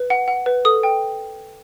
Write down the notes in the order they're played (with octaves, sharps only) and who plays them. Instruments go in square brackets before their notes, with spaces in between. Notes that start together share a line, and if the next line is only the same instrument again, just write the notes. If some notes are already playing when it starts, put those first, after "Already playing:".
Already playing: [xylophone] B4
F#5
F#5
B4
A4 D#6
G5